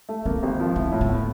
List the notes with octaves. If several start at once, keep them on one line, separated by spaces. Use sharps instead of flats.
A3
A#3 C4
G#1
F3
B3 E4
A2
A3
B3